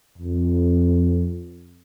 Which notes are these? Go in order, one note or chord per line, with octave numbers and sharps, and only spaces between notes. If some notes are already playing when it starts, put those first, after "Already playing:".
F2